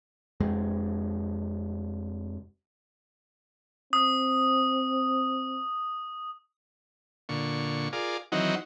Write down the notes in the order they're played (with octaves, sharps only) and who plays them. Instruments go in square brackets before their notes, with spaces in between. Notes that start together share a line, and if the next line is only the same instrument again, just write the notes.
[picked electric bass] F1 F2 G#3
[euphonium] C4 [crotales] D#6
[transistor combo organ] A#2 D3 C#6
F4 G#4 A#4 D5
D#3 E3 F#3 C4 D#4 F#4